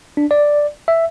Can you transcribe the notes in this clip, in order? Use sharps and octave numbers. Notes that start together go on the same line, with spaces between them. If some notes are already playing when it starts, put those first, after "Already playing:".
D4
D5
E5